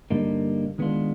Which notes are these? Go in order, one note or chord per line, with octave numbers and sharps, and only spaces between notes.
G2 D3 G3 A#3 D#4
D#3 G#3 B3 D4 F4